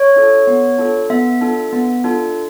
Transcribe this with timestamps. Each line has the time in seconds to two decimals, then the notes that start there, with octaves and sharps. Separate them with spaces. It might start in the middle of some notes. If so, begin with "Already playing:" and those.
Already playing: C#5
0.16 D4 F4 A4
0.47 B3
0.78 D4 F4 A4
1.10 B3 E5
1.41 D4 F4 A4
1.73 B3
2.04 D4 F4 A4